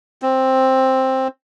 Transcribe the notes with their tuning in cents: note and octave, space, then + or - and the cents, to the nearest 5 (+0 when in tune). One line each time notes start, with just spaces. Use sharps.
C4 +10